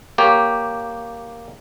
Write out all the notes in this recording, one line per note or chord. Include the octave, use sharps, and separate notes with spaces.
A#3 G4 C#5